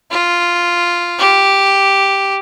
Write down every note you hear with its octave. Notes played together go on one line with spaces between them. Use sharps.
F4
G4